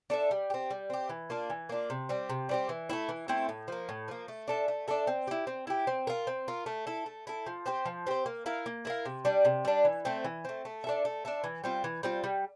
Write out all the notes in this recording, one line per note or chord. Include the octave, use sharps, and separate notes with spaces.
D4 A4 E5
G3
C4 G4
G3
C4 G4
E3
A#3 D4 F4
E3
A#3 D4 F4
C3
G3 C4 G4
C3
G3 C4 G4
E3
A3 C4 E4
E3
A3 C4 E4
A2
F3 A#3
A2
F3 A#3
A3
D4 A4 E5
A3
D4 A4 E5
C4
E4 G4
C4
E4 G4
C4
F4 A#4
C4
F4 A#4
A3
E4 A4
A3
E4 A4
F3
C4 G4 C5
F3
C4 G4 C5
A#3
E4 A#4 F5
A#3
E4 A#4 F5
C3
G3 D4
C3
G3 D4
E3
A3 C4
E3
A3 C4
A3
D4 A4 E5
A3
D4 A4 E5
E3
G3 C4 F4
E3
G3 C4 F4
G3